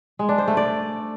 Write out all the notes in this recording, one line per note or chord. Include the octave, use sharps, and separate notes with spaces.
G#3
D4
C5
A3
D5